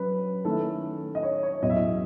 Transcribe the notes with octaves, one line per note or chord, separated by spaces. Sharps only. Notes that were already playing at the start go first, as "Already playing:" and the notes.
Already playing: F#3 C#4 B4
D#3 A3 C#4 E4 A4
D#5
C#5
C#5
E2 B2 F#3 C#4 D#5
E5
D#5